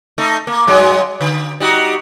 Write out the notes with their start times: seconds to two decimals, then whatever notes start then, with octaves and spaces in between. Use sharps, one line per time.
0.18 A3 D#4
0.47 A#3
0.67 G2 F#3 G#3
1.21 D3
1.60 G3 D#4 F#4